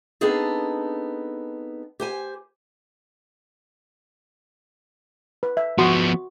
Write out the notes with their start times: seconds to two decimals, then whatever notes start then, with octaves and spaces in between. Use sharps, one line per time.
0.21 B3 C4 D4 D#4 G#4 A4
2.00 G4 C5 G#5
5.43 B4
5.57 E5
5.78 F3 B3 F#4 C6 D#6